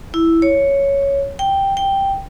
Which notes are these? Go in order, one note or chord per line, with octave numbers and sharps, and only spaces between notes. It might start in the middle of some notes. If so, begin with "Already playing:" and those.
E4
C#5
G5
G5